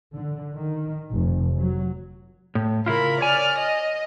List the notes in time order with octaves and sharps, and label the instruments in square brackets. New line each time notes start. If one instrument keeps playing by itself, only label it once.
[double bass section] D3
D#3
F1
F#3
[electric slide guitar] A2
[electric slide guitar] C#3 E4 F4 [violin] A#4 B5
[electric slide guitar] C#5 G#5 [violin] D5 F6
[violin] D#5